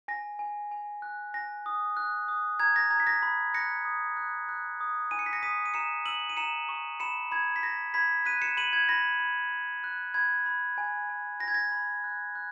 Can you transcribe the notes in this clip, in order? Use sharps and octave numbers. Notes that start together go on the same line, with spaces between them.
G#5 A#6
G#5
G#5
F#6
G#5 A#6
D#6
F#6
D#6
A#5 G#6
A#6
A#5 G#6
B6
A#6
B5
F#6 A#6 C#7
D#6
F#6
F#6
D#6
G#5 D#7
C#7
B6
A#6 C#7
D#6 B6 D#7
D#7
A#5 C#7 E7
E6 D#7 F#7
D#7
A#5 C#7 E7
C#6
B5 C#7 E7
B5 G#6
B6
B5 A#6
B5 G#6 B6
F#6 B6 D#7
C#7 E7
B5 D#7 F#7
G#6
B5 A#6
B5
B5
F#6
B5 G#6
B5
G#5
G#5
G#5 A#6
G#6
A#6
B5
F#6
F#6